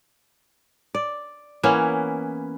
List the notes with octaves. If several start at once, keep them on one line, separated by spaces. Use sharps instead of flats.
D5
E3 A#3 B3 C#4